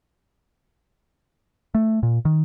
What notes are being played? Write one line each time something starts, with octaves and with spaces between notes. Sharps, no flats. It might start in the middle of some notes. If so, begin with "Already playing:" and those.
A3
A#2
D#3